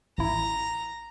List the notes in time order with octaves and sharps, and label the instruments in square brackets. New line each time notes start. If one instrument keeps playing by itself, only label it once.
[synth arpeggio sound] A1 E4 [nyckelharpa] A#5